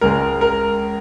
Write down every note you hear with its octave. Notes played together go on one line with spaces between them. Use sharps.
C#2 C#3 G#3 A#4
A#4